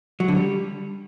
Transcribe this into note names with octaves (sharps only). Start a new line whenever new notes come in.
F#3
D3
G3